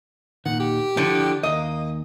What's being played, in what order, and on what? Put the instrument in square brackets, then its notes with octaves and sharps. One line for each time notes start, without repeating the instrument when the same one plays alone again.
[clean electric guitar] D#2 A#2 D#3 [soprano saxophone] F#5
[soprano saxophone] G4
[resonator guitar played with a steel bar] D3 F3 [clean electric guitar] E4 A4 G5
[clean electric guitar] D#2 [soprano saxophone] A#3 [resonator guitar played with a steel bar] D#5